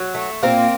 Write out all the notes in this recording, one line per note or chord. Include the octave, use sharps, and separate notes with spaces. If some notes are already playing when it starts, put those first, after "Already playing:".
Already playing: F#3
A3
A#2 A#3 C4